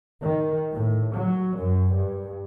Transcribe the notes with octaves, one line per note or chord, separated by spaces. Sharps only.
D#3
A2
F#3
F#2
G2